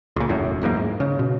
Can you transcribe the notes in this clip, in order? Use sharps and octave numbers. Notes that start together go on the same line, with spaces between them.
C#2 A#2
E1 F#2 A2
D1 E2 G#2 A#3
G#2
C#3
B2